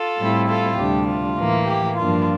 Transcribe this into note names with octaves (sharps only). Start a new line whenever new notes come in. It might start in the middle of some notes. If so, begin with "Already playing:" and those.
Already playing: F4 A4
A2 G3 C4 E4
F4 A4
D2 C3 G3 D4 G4
F4
A2 E3 A#3
G4
G2 F3 A#3 D4 F4